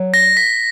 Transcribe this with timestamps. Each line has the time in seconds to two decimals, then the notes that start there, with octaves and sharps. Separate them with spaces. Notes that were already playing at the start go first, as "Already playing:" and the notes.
Already playing: F#3
0.14 A#6
0.37 B6